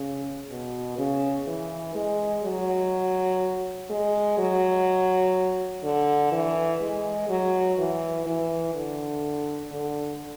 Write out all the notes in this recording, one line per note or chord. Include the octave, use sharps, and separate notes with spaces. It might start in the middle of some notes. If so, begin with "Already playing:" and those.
Already playing: C#3
B2
C#3
E3
G#3
F#3
G#3
F#3
D3
E3
G#3
F#3
E3
E3
D3
D3